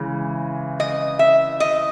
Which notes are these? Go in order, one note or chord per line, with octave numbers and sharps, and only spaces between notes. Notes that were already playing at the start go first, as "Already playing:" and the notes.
Already playing: C#3 E3 G#3
D#5
E5
D#5